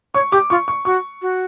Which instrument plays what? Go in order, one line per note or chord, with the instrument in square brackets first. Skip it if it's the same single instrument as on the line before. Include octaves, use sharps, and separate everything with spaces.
[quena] C#5 [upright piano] C#6
[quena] G4 [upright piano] D6
[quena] F4 [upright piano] C#6
[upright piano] C#6
[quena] F#4 [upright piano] C#6
[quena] F#4